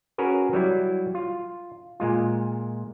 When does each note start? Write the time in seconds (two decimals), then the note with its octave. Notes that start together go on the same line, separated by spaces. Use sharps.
0.18 C#4 F#4 G#4 A#4 B4
0.53 F#3 G3 E4
1.15 F4
2.00 A#2 G#3 F4